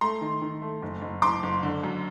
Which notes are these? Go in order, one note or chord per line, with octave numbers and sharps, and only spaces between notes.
A3 A#5 C6
D#3
D#3
A3
F#1
F#1
F#1 C6 D6
F#1
D3
F#2